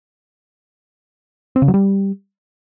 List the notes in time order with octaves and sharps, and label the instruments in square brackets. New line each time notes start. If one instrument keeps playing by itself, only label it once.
[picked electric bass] C4
C#3
F#3
G3